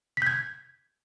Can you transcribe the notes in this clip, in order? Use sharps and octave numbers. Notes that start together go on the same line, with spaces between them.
G6 G#6 B6